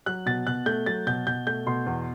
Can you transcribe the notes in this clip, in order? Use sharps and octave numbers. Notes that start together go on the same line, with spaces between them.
F#3 F#6
B2 A6
B2 F#6
A3 G6
F#3 A6
B2 G6
B2 G6
A3 G6
B2 C6
E2